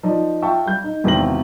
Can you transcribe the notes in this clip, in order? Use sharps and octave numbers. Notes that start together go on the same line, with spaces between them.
F3 D#4 D5
F4 E5 G5 A5 C#6
G3 G6
D#4
G#1 E2 C3 G5 A#6 F#7